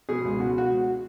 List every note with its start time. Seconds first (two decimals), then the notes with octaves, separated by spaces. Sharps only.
0.09 B2 G#4
0.24 C#2
0.40 B2 F#4
0.58 F#4